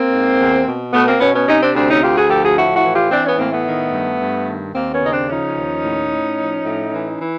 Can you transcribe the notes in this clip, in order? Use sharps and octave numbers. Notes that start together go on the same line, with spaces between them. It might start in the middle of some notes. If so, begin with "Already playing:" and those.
Already playing: A#3 C4
G#2
E2
B2
B2 A3 B3
A#3 C4
B2 B3 C#4
B3 C#4
C3 C#4 D#4
C4 D4
D2 C4 D4
C#4 D#4
D2 F4 G4
F#4 G#4
F3 G4 A4
F#4 G#4
A2 E4 F#4
E4 F#4
E3
F4 G4
E3 C4 D4
B3 C#4
A2 A#3 C4
A3 B3
D#3
G2
G2
D#3
D#2 A#3 C4
B3 C#4
C#3 D#4
C4 D4
F3 C#4 D#4
D#2
A2
A2
F3
A2
E3
E3